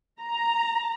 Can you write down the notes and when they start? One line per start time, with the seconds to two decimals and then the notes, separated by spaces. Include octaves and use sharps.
0.21 A#5